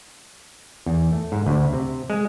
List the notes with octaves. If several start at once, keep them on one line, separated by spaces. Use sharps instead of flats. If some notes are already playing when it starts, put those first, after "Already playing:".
E2
A3
G#2
D2
C3
G#3